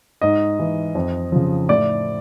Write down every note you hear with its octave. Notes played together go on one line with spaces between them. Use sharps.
G#2 D#5
E3
F2
C#3 F3
A2 D5